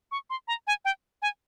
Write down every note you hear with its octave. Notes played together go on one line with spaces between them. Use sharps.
C#6
C6
A#5
G#5
G5
G#5